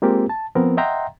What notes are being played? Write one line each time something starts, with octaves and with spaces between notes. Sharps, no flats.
G#3 A#3 C4 F4 G4 A#4
A5
F3 B3 C4 A#4
D#5 E5 F#5 G5 A#5 C6